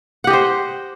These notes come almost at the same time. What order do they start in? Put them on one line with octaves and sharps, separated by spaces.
F#5 G4 D#5 C5